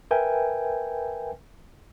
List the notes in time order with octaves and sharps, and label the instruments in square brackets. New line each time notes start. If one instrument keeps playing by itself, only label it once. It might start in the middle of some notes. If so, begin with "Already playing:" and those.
[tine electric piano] A#4 B4 E5 G5 G#5